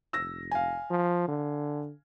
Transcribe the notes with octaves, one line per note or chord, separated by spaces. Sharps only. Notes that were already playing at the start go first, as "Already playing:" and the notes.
F1 E6 A#6
F5 G#5
F3
D3